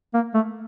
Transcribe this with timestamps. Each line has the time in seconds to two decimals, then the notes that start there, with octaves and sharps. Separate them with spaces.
0.14 A#3
0.34 A3